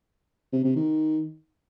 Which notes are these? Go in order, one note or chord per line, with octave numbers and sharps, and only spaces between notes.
C3
C3
D#3